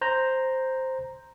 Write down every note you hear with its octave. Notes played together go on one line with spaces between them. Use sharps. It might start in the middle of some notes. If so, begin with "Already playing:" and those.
C5 A#5 G6